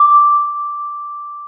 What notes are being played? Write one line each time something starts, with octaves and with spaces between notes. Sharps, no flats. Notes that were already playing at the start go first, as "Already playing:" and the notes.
Already playing: D6